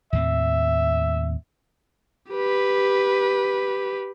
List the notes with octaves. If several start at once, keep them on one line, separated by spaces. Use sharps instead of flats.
D#2 A2 C4 E5
G4 B4